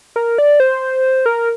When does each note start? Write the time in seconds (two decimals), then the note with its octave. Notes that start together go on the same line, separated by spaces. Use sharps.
0.16 A#4
0.38 D5
0.60 C5
1.26 A#4